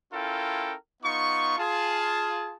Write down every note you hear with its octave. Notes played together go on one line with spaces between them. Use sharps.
C#4 E4 F4 A4 A#4 G5
B3 D#4 F4 C#6
F4 G#4 A5